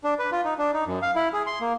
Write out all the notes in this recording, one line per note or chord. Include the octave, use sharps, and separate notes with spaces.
D4
B4
F4
D#4
D4
D#4
F#2
F5
E4
G#4
C6
A#3